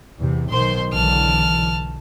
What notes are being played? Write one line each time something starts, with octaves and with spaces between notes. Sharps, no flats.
E2 C3
B1 B2 D#3 C5 C6
B1 D3 E3 A5 F6